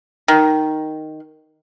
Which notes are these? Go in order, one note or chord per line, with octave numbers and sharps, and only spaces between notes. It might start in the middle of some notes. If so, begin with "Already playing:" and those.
D#3